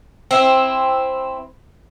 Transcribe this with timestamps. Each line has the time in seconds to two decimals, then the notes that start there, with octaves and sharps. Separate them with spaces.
0.31 C4 E4